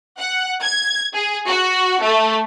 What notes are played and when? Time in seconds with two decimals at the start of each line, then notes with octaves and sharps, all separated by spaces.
0.18 F#5
0.63 G#6
1.14 G#4
1.47 F#4
2.02 A3